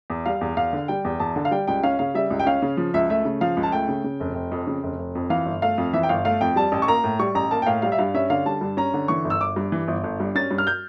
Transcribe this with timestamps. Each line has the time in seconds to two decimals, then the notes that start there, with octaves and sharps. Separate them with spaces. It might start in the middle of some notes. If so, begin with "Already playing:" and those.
0.10 E2
0.26 G3 F5
0.41 E2
0.57 E2 F5
0.73 D3
0.88 G3 G5
1.05 E2
1.20 E2 A5
1.36 D3
1.45 F5
1.51 G3 G5
1.67 C#2 G5
1.83 C#4 F5
1.99 C#3 F5
2.15 G3 E5
2.30 C#2
2.40 G5
2.46 C#4 F5
2.62 C#3
2.77 F3
2.94 C#2 E5
3.09 A3 E5
3.25 C#3
3.41 F3 F5
3.57 C#2
3.63 A5
3.72 A3 G5
3.88 C#3
4.04 C#3
4.20 F1
4.35 F1
4.51 F2
4.67 C#3
4.83 F1
4.99 F1
5.15 F2
5.30 E3 F5
5.46 G1
5.62 A3 F5
5.78 F2
5.93 E3 E5
6.03 G5
6.09 G1 F5
6.25 A3 F5
6.41 F2 G5
6.56 G3 A5
6.72 A1
6.82 C#6
6.88 A#3 A#5
7.04 A2
7.19 G3 C#6
7.35 A1 A#5
7.51 A#3 A5
7.62 G5
7.66 A2 F5
7.82 G3 F5
7.92 E5
7.98 G2 F5
8.14 C#4 E5
8.30 D3 F5
8.46 G3 A5
8.61 G2
8.77 C#4 A#5
8.94 D3
9.08 E3 C#6
9.25 G1
9.30 E6
9.40 G1 D6
9.56 G2
9.72 E3
9.88 G1
10.04 G1
10.20 G2
10.35 C#4 A6
10.51 G2
10.58 F6
10.67 G6